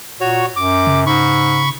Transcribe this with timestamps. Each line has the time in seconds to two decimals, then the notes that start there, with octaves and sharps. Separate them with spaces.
0.20 A#2 F#4 C#5
0.56 F#2 D6
0.87 C#3
1.07 G#2 B5 C#6